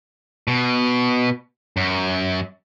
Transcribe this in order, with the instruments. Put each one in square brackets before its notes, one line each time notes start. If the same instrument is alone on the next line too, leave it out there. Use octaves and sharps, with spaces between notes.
[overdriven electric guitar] B2
F#2